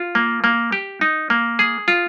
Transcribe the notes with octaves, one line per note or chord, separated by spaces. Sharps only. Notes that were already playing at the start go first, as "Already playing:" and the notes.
Already playing: F4
A#3
A#3
G4
D#4
A#3
G#4
F4